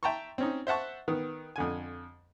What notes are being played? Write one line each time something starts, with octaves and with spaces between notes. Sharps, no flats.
E5 G5 A5 A#5 C6 C#6
C4 C#4 D#4
C5 E5 F#5 A5 C#6
D#3 B3
F2 D3 G#5